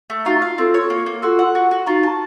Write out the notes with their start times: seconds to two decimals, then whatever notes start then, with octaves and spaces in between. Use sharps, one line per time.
0.10 A3
0.26 D#4 F4 F#4
0.42 F5
0.58 C4 F4 A4
0.74 C#5
0.90 A#3
1.06 A#3
1.22 F4 F#4 A4
1.39 F#5
1.55 F#4
1.71 F#4
1.87 D#4 F4 F#4
2.03 A5